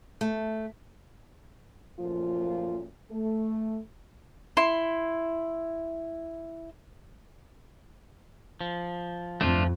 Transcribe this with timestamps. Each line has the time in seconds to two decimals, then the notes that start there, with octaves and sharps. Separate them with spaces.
0.21 A3
1.99 F#2 A#2 F3 A3 F4
3.10 A3
4.57 E4 C6
8.61 F3
9.41 F2 F3 A3 D4 F4